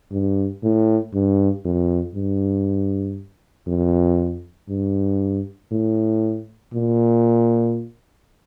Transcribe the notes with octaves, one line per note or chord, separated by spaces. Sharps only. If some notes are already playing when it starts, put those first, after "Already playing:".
G2
A2
G2
F2
G2
F2
G2
A2
A#2